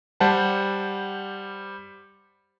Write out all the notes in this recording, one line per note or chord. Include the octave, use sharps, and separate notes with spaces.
G3 C5 F#5 A5